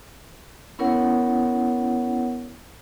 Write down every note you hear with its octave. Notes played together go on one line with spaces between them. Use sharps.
B3 C#4 E4 A#4 C#5 F#5